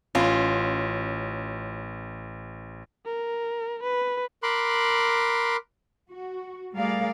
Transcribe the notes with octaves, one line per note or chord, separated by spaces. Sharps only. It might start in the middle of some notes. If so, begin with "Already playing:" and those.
A1 C#4 F4
A#4
B4
A#4 B5 C6 D6 F#6
F#4
G3 A3 G#4 A#4 D5 F5